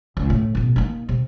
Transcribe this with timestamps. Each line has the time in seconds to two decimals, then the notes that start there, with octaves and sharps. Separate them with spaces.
0.17 C#2
0.30 A2
0.55 A1 B2
0.76 A#3 D#4
1.09 C3